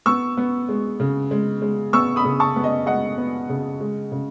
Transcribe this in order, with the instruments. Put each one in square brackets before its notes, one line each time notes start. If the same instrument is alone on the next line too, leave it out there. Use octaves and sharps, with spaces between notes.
[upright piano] B3 C#6 E6
B3
G#3
C#3
G#3
G#3
B3 C#6 E6
B5 D#6
C#3
A5 C#6
B3
D#5
G#3 D#5 F#5
B3
C#3
G#3
C#3